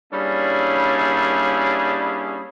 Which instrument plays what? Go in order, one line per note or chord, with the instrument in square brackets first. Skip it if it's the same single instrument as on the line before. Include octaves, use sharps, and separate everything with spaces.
[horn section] G3 A#3 C#4 D4 E4 G#4